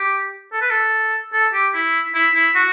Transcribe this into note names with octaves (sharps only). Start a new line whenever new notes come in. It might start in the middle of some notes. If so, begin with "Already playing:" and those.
Already playing: G4
A4
B4
A4
A4
G4
E4
E4
E4
F#4